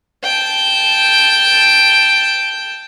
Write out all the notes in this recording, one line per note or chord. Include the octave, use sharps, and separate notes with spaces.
G5 A5